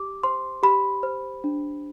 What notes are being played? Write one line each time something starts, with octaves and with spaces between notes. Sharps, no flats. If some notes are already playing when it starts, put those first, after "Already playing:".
Already playing: G4 D6
C5 C6
G4 B5
C5
D4